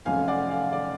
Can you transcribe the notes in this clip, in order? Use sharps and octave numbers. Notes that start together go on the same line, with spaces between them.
F1 F2 C#3 F#3 C#4 F5 G#5
D5 F#5
F5
D5